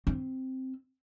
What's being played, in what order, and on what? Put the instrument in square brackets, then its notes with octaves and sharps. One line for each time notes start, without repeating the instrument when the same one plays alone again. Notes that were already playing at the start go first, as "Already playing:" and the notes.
[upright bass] C4